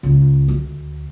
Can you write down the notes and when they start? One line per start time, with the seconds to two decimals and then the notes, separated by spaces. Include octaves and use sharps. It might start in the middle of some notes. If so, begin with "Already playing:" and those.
0.03 C#2
0.48 D2